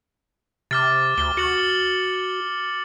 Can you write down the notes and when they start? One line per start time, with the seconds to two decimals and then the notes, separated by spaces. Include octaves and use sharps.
0.71 C3 D6 F6 A6
1.18 D2 G7
1.37 F#4 C#7 F#7